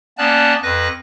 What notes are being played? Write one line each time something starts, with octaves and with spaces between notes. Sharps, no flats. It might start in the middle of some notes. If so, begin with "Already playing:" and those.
A#3 B3 C#4 D5 A5 F#6
F2 B4 F#6 A#6